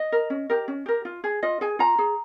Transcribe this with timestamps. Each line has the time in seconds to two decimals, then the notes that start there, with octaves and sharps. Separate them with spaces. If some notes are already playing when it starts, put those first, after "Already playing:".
Already playing: D#5
0.12 A#4
0.30 C#4
0.50 G4 A#4
0.68 C#4
0.86 G4 A#4
1.05 F4
1.24 G#4
1.43 F4 D#5
1.61 G#4 G#5
1.79 F4 A#5
1.99 G#4